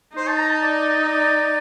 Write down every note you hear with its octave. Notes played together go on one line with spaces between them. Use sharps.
D#4 C5
A5
A#5
A5
D5
D#5
D5